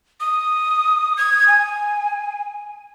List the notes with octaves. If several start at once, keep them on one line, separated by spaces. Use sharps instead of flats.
D#6
G#6
G#5